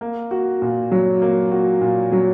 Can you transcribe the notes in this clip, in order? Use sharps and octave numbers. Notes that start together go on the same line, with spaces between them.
A#3
F#4
A#2
F#3
A#3
F#4
A#2
F#3